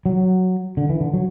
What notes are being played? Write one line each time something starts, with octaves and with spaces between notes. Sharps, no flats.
F#3
D3
E3
D3
F#3